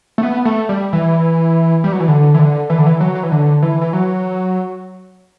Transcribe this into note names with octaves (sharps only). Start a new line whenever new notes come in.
A3
B3
A3
G3
E3
G3
F#3
E3
D3
E3
D3
E3
D3
E3
F#3
F#3
E3
D3
E3
E3
F#3